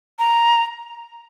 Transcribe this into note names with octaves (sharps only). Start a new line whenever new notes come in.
A#5